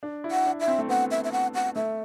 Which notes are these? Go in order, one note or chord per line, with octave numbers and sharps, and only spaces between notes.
D4
E4
F#5
D4
E5
C4
A3
B3 F#5
E5
E5
F#5
F#5
A3 E5